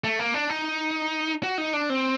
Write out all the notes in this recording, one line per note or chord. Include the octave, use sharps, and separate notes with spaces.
A3
A#3
D4
D#4
F#4
D#4
D4
C4